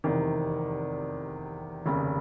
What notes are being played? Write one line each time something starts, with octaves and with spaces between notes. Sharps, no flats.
F1 E2 C3 D#3
F1 D#2 C#3